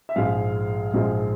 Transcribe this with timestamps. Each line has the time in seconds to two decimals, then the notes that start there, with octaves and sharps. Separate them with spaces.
0.09 E5
0.16 A#1 G#2 F3 G#3 F5
0.93 A#1 G#2 F3 G#3